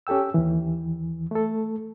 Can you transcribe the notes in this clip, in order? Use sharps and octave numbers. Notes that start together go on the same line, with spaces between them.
C#4 G4 A4 G5 E6
D#2 E3
A3 A4